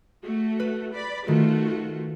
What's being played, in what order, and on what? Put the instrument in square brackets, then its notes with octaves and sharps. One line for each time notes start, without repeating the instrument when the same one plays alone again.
[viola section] A3 F#4
[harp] B4
[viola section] D5 B5
[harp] D#3 [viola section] A3 F4 F#4